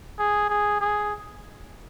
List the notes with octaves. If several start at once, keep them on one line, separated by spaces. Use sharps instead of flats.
G#4
G#4
G#4